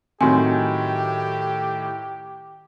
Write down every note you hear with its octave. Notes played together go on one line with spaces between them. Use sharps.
A2 D#3 F#3 C4 G4 G#5 C6